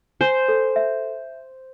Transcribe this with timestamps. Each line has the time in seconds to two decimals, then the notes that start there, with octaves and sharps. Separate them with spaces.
0.21 C5 G#5
0.48 A4
0.76 E5